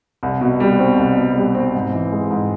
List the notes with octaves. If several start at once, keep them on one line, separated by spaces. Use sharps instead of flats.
C2
B2
G3
C4
C2
B2
G3
C4
G#2
E3
G#3
G#2